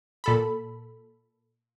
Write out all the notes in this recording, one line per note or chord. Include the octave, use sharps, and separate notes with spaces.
A#2 A4 B5